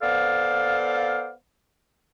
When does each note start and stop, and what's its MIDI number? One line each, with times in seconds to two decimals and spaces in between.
0.02 1.32 59
0.02 1.32 69
0.02 1.32 72
0.02 1.32 74
0.02 1.32 77